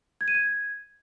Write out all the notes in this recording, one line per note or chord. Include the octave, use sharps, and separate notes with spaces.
G#6
D#7
G#6